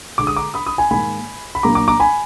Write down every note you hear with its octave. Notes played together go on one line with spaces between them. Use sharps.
D3 G#3 D4 D6
D#6
A#5 D6
B5 D#6
B5 D#6
G#5 B5
G#2 D#3 A#3 G#5 B5
B5
A#2 F#3 A#3 D4 A#5 D6
A#5 D6
A#5 D6
G#5 B5